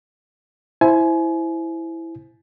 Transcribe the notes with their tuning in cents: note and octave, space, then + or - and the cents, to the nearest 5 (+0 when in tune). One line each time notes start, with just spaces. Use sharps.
E4 +0 C5 +0 G#5 +30